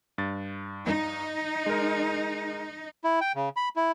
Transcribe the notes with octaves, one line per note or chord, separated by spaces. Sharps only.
G2 A6
D#4
G#3 A#4
E4
G5
C#3
B5
E4